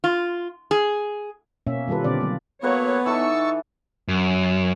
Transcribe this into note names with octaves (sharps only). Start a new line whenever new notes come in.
F4
G#4
B2 A#3 C#4 E5
D#3 G3 F4 A4 B4
B2 D3 C4 D5
F#3 A#3
F#3 A#3 B3 A4 C#5 F#5 A#5
E3 D#4 A4 A5 C#6 E6
F#2